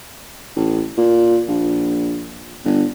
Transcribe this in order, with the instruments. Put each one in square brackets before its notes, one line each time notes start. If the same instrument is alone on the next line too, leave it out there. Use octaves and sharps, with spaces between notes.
[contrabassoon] A1
A#2
A#1
G1